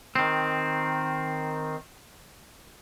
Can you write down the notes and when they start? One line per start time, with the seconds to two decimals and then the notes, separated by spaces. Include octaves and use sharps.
0.16 D#3 C4